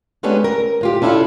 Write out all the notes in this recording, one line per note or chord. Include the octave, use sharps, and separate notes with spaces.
G#3 A3 B3 C#4 D4 G4
A#4
A2 F4 G4
C#4 D4 E4 F4 A4 F5